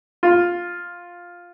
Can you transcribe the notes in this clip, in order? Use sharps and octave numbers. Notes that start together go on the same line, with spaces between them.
F4